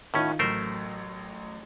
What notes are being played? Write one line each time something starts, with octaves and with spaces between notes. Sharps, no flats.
A2 D#3 C#4 D#4 F4
A1 F#3 A3 A#4 C5